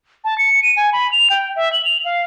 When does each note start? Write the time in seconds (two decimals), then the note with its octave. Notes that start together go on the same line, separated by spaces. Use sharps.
0.24 A5
0.38 C#7
0.63 D#7
0.77 G#5
0.93 B5
1.12 F7
1.30 G5
1.56 E5
1.73 F#7
1.85 F7
2.05 F5